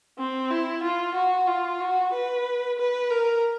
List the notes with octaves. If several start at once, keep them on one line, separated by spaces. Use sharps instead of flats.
C4
E4
F4
F#4
F4
F#4
B4
B4
A#4